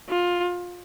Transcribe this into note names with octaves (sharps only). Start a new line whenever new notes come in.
F4